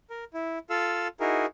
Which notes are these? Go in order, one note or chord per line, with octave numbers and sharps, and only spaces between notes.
A#4
E4
F4 A4 F5 E6
D#4 E4 F#4 G#4 A#4